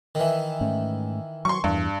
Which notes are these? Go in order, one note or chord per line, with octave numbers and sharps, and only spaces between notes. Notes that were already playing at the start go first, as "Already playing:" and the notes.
D#3 E3
G#2 A3 C#4
F#3 C6 C#6
E2 G2